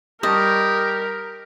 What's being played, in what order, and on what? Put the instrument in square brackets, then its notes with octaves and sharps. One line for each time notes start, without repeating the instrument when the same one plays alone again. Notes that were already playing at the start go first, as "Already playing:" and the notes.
[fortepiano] G3 A5 C#6 [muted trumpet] G4 [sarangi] A#4 [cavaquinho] D#5